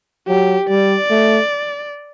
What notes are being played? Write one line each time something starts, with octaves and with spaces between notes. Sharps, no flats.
F#3 G4
G3 D5
A3